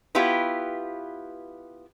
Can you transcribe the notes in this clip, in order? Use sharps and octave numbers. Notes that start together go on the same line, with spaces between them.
B3 E4 F4 G4 B4